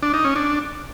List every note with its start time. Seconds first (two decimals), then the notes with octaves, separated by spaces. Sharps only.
0.03 D4
0.14 D#4
0.25 C#4
0.36 D4